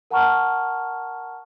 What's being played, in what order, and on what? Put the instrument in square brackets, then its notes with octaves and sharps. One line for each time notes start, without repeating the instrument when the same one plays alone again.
[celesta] A#4 F#5 A5 A#5 C#6 F6